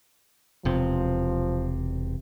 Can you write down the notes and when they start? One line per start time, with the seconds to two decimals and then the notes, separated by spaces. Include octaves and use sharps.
0.65 E1 C3 F3